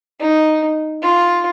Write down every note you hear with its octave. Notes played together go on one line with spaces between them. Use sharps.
D#4
F4